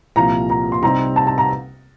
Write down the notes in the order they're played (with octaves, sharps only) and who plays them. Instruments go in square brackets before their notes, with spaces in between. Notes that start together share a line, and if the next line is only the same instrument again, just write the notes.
[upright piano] C2 A#2 F3 A#5
A#5
C6
C3 G3 C4 D#4 A#5
A5
A5
A#5